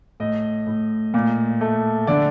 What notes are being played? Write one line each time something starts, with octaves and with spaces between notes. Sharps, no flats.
A2 D#5
A2
A#2
A3
D3 D5